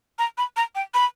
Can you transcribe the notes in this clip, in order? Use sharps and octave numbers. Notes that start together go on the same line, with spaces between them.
A#5
B5
A#5
G5
B5